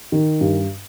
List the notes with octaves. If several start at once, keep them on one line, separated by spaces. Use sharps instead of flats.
D#3
G2